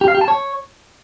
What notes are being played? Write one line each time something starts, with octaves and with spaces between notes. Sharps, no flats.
G4
F5
G4
A5
C#5